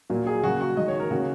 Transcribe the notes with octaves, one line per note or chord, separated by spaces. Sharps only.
A#2 F#3 A#3
G#4
C#3 F#3 A#3 F#4
F#4
D#3 G#3 D#5
C#5
A#4
C#3 F#3 A#3 F#4